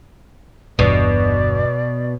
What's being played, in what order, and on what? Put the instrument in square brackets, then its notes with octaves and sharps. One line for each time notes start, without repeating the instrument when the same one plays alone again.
[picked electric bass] G1 E2 G2 [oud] B2 [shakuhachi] D5